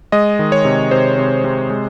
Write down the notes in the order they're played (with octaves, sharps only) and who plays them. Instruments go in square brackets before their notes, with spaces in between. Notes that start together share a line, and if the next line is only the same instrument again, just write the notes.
[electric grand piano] G#3 D#5
D#3
C#5
C3
C3 C5
C3
C3
G#3